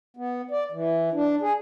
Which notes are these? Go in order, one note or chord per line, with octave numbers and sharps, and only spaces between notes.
B3
D5
E3
D4
G#4